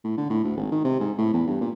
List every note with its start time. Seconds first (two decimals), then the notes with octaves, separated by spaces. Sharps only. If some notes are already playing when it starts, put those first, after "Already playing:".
0.03 A2
0.17 D3
0.30 A2
0.44 D2
0.57 G#1
0.71 D#3
0.84 C3
1.00 G#2
1.18 A2
1.33 E2
1.47 G2
1.61 A#2